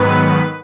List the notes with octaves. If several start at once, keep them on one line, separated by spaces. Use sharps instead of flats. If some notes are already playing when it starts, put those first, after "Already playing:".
Already playing: G#2 D#3 F#3 B3 B4